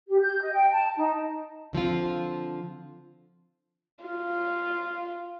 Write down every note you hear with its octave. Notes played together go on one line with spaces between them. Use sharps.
G4
G6
D#5
G5
A5
D#4
D3 F3 C4 F4
F4